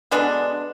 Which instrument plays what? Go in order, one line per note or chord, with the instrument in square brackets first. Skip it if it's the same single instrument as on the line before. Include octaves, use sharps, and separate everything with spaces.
[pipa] B2 D3 G#3 B3 D4